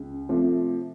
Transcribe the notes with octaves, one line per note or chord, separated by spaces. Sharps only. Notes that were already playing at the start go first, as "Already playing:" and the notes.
Already playing: C#2
C3 F3 A3